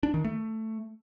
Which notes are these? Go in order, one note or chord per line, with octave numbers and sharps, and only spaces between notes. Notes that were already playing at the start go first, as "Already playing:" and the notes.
D4
D#3
A3